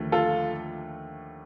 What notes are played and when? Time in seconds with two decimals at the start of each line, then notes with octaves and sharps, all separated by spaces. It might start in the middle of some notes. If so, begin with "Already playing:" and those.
Already playing: D#2 D3 F3 A3
0.12 F4 A4